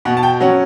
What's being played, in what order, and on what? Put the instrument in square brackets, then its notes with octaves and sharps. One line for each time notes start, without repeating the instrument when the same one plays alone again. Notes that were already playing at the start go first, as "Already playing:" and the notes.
[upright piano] B2 F#5
A5
G5
F#3 C#4 F#5